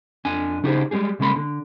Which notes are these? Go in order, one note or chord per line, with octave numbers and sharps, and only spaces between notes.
F2 D4 G#5
C#3 D#4 E4 G4 G#4 C5
G3 G#3 C4 G4 G#4
B1 C#3 G#3 A#3 B5 C6
D3